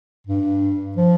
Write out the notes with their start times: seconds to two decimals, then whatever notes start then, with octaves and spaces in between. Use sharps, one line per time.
0.27 G2
0.97 F3